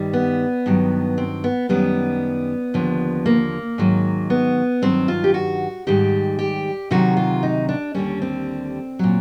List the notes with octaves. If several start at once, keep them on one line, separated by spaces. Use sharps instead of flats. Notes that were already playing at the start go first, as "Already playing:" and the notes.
Already playing: G2 D#3 G3
B3
G2 D#3 F#3
C4
B3
F#2 D#3 G3 B3
D#2 D3 F3
A#3
G#2 D#3 F#3
B3
G2 D#3 F#3 C4
F4
G4
F#4
G#2 D#3 G3 G4
G4
D2 C3 D#3 F#3 F#4
F4
D#4
D4
D#2 D3 G3 C#4
C4
A#2 F#3